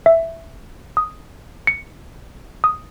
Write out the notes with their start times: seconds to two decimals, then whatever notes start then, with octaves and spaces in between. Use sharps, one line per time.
0.06 E5
0.97 D#6
1.67 C#7
2.64 D#6